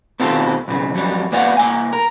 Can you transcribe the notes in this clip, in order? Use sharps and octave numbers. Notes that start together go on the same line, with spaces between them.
B2 D#3 C4 F4 G4 A4
B1 G2 C#3
F2 F#3 G3
A#3 B3 D5 F5 F#5
C2 A#3 G#5
A#4